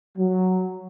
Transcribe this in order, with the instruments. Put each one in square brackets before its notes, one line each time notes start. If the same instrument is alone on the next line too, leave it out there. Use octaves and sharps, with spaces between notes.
[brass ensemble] F#3